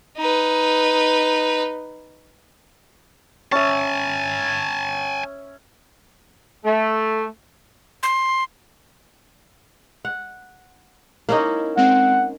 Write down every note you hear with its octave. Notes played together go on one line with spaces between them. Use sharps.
D#4 B4
C#4 E5 G#5 A5
A3
C6
F#5
A#3 C#4 D#4 E4
G#3 C4 F#5